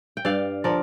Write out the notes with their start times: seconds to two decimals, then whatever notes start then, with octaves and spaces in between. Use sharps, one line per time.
0.17 G5
0.25 G2 D5 F5
0.64 D3 F3 A#4 D5